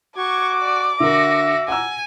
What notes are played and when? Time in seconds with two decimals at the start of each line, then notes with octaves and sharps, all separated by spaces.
0.17 F#4 C#6 D6 G#6
0.60 D5
1.00 D3 F#4 A#4 E5 A#6
1.68 F#5 G#5 A#5 E6